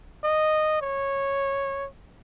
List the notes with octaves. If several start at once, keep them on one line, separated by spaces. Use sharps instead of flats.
D#5
C#5